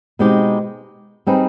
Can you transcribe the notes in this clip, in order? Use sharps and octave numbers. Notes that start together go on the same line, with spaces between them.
B2 G#3 C4 D#4 G4
G3 C4 D#4 G#4 B4